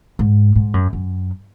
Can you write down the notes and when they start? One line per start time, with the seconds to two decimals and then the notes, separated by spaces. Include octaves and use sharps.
0.19 G#2
0.55 G#2
0.74 F#2
0.93 F#2